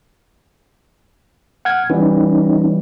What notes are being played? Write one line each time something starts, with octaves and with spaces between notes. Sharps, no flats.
F#5 F6 G#6
E3 G3 C#4 D#4